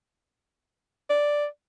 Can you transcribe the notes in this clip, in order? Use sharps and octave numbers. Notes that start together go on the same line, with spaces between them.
D5